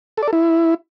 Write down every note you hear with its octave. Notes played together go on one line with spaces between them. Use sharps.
A4
D5
A4
E4